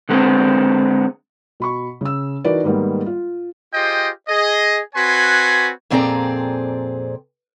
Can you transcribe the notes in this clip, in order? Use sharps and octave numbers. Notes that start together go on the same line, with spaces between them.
D3 G#3 B3 C4
B2 B5 C#6
C#3 E6
E3 D#4 F#4 A#4 B4 D5
G#2 D#3 G3 A#3 B3
F4
F4 G4 G#4 C5 D#5 G5
G#4 D#5
C4 F#4 B4 C#5 G#5 C6
F2 A#2 C4 G#4 D5 A#5